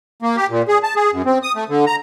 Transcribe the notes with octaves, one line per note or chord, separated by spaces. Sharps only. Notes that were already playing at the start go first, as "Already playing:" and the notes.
A#3
G4
A#2
G#4
A5
G#4
F#2
C4
D#6
A3
D3
A#5